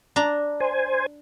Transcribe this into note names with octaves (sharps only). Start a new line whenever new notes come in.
D4 A#5
C5 G#5